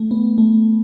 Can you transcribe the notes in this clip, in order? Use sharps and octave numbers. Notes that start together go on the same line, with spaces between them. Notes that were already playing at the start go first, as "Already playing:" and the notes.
Already playing: A3
B3
A3